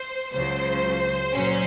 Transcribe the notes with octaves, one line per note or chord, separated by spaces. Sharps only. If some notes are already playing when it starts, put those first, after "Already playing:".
Already playing: C5
C#2 C#3 F#3 C5
A#2 F#3 C#4